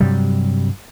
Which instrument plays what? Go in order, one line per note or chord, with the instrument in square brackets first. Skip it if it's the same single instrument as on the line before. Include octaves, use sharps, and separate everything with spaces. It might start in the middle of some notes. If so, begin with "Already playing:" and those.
[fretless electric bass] G2 C3 F#3 G3